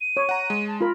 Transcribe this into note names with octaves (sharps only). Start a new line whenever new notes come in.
D#7
C#5
F#5 A#5
G#3
A5
F4 A#4 B5